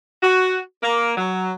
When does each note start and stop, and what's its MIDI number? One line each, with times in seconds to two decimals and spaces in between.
0.23 0.59 66
0.83 1.12 58
1.17 1.52 54